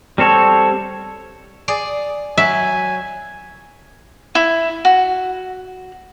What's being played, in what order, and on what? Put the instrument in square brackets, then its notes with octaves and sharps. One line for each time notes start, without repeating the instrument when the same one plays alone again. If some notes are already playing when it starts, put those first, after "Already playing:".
[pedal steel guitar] G3 C4 A4 C#5
[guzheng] G#4 D5
[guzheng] F#3 [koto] E5 [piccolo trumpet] G#5
[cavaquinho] E4
F#4